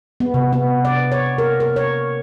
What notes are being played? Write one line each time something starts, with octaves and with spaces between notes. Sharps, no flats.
B3
C3
B3
D5
C#5
A#4
A#4
C#5